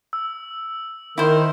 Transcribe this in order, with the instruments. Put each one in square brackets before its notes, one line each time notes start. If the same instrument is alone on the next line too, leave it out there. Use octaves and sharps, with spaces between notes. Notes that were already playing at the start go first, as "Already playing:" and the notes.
[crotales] E6
[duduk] D#3 [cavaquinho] E4 C5